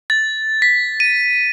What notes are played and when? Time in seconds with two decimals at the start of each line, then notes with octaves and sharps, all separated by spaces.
0.10 A6
0.62 B6
1.00 D#7